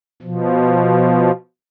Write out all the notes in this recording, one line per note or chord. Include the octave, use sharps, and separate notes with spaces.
B2 F3